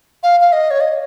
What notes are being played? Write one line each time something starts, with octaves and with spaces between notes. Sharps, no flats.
F5
F5
D#5
C#5
D#5